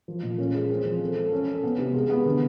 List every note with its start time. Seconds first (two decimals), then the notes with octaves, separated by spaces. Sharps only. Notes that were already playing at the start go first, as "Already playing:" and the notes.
0.08 F3
0.23 A#2
0.38 C#4
0.54 G#3
0.70 C4
0.85 F3
1.01 A4
1.16 A4
1.32 C#4
1.48 A4
1.63 B3
1.79 C3
1.94 G#3
2.10 B3
2.26 D3